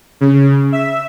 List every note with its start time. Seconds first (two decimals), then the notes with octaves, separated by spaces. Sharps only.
0.21 C#3
0.72 E5